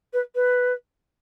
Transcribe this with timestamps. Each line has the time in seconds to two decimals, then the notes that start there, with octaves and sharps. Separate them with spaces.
0.13 B4
0.35 B4